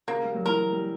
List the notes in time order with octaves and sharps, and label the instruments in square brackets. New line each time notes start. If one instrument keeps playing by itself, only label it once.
[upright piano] C#3 [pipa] A#3
[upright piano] G3
F#3
[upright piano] E3 [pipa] A#4
[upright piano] G3